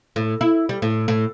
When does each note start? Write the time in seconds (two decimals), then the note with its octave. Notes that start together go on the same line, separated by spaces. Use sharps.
0.16 A2
0.41 E4
0.69 G3
0.82 A2
1.08 A2